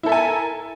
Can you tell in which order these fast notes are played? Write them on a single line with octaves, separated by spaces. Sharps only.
E4 A4 E5 G#5 A#4